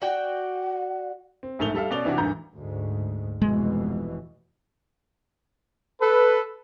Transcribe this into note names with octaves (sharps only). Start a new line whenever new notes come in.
F#4 D5 F#5 G5
C4
A#1 G#2 A3 F7 G7
G3 A4 E5 F5
B2 C#4 D5 F7 G7
C3 E3 D4 E4 F#4
G#1 D2 G2 E3 A#5 G6
D2 G#2
F1 B2 E3 G#3
A4 B4